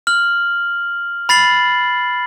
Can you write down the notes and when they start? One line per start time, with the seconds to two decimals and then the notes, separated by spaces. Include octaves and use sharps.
0.07 F6 F#7
1.29 B5 A6 C7 F#7